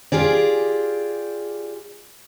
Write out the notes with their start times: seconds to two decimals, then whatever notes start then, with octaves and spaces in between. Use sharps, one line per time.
0.12 F4 G4 G#4 D5